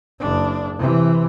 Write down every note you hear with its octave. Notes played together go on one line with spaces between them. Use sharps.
F#1 D4
C3 E3